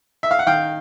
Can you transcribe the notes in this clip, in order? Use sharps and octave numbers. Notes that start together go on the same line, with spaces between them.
E5
F5
F#5
D#3 F5 G5